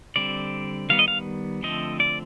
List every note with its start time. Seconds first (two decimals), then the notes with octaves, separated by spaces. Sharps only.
0.16 D3 G3 C4 D5
0.90 D#3 G3 B3 F5
0.99 D#5
1.08 F5
1.63 D3 F3 A3 C4 D#5
2.00 D5